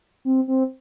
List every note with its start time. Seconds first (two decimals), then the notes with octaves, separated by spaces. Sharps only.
0.25 C4
0.48 C4